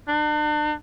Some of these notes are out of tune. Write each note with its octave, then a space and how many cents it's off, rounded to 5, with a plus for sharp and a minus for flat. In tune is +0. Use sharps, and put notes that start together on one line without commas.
D4 +40